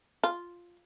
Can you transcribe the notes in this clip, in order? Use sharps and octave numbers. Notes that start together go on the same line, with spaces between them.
F4